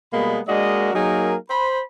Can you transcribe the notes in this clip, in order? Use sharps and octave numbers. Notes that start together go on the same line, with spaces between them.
B2 G3 G#3 A#3 B3 B5
G#3 A#3 D4 F#4 A#4 D#5
F#3 A#3 D#4 G#4 A#4
C5 B5